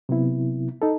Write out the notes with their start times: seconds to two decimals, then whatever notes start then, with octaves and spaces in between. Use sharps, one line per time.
0.09 C3 F#3 B3 E4
0.82 D#4 A4